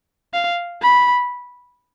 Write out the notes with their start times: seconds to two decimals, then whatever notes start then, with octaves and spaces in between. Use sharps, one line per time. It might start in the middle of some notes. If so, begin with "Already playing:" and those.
0.34 F5
0.82 B5